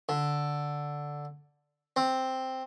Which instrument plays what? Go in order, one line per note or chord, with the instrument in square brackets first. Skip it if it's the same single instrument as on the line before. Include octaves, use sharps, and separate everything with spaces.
[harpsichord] D3
C4